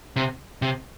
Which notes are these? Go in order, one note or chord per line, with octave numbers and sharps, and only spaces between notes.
C3
C3